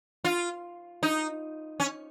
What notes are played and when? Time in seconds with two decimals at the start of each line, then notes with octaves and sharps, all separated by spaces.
0.24 F4
1.03 D#4
1.80 C#4